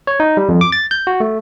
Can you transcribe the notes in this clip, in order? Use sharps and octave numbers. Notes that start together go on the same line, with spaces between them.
C#5
D#4
G3
F2
D6
A6
G6
F#4
A3